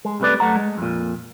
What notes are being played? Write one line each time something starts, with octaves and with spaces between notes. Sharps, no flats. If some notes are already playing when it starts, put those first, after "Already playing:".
G#3
C2 C3 A3 B4 D5
F#2 A3 F#5 A#5
G#3
F2 A#2